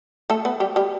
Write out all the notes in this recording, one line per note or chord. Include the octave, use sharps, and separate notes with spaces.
A3 A4
B3 B4
G3 G4
G3 G4